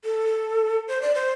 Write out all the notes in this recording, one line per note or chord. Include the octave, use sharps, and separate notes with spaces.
A4
C5
D5
C5